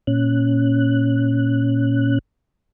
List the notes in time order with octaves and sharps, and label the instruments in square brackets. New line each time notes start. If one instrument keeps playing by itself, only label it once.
[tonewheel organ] A#2 C#4 F#6